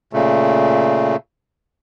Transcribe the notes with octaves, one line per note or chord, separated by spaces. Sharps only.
A#2 C#3 A3